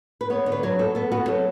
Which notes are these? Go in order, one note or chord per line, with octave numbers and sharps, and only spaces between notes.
B4
B3 C#5
D3
B4
F#3 C#5
B3 A4
B3 A4
B3 F#4
F#3 A4